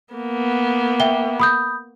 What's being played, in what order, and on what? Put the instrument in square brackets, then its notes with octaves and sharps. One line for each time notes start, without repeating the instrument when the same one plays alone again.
[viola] A#3 B3
[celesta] E5 G5 G7
B5 D#6 G6